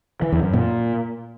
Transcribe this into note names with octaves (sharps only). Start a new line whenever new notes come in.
E3
E2
F#2
A#2